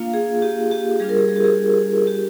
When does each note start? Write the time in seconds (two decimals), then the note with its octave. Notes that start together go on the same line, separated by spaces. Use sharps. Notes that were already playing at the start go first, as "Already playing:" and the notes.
Already playing: A#3 D4 F4 F5
0.14 G#4
0.42 G4
0.71 G4
1.00 G3 D4 F4 G#4
1.09 A#4
1.18 G#4
1.29 G#4
1.36 G4
1.44 G#4
2.07 G4